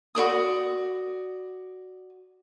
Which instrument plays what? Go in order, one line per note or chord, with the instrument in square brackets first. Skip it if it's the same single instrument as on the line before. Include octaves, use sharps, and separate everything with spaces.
[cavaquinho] F#4 C5 D5 D#6